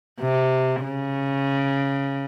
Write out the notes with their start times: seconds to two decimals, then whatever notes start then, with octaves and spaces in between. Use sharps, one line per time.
0.21 C3
0.84 C#3